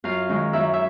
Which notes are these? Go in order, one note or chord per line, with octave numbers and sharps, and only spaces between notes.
F#2 F4 F5
D#3 G#3 C#4
F#2 E4 E5
E5